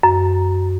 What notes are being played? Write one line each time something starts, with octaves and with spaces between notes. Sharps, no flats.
F#2